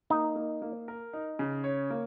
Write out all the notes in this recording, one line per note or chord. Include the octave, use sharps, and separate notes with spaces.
A#3 D#4
A#3
A#3
A#4
D#4
C#3
C#5
A#3